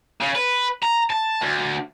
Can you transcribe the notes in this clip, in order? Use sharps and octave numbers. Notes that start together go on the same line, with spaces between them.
C#3
B4
A#5
A5
D2